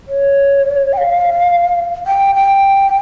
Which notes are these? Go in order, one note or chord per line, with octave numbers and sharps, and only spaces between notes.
C#5
G5
F5
G5
G5